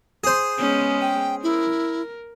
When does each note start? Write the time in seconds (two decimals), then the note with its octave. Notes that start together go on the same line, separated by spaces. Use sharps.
0.24 G#4 C5
0.58 G#3 B3 C#4
1.01 G5
1.43 E4 A#4